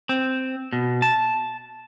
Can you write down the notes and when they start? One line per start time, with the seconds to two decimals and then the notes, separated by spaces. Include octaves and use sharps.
0.09 C4
0.73 B2
1.02 A5